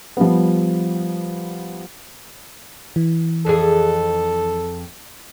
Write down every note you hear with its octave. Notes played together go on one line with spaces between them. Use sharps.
F3 G3 B3
E3
F2 G#4 A4